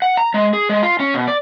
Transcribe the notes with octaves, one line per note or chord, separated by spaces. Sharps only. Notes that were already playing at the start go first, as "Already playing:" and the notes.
F#5
A#5
G#3
G#4
G#3
F4
C#4
B2
D5